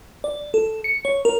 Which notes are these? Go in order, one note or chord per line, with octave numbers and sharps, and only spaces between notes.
D5
A4
C#7
C#5
A#4